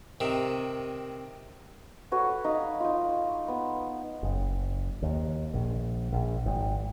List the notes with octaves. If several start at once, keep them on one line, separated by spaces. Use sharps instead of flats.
C3 D#3
F#4 A4 B4 C#5
D#4 F5
D#4 F4
B3
F#1
D#2
A#1
A#1
G#1